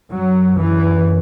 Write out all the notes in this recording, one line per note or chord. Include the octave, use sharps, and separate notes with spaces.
F#2 F#3
E3